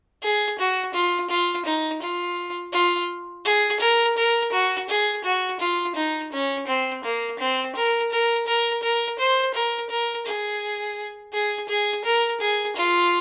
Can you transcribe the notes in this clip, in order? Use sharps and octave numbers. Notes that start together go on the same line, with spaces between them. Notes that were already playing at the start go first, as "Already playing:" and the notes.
G#4
F#4
F4
F4
D#4
F4
F4
G#4
A#4
A#4
F#4
G#4
F#4
F4
D#4
C#4
C4
A#3
C4
A#4
A#4
A#4
A#4
C5
A#4
A#4
G#4
G#4
G#4
A#4
G#4
F4